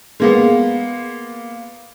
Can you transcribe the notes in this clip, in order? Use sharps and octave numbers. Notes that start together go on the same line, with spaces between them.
G#3 A#3 B3